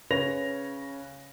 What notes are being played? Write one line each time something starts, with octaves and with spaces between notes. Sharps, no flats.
C#3 B4 C#5 A#6 F7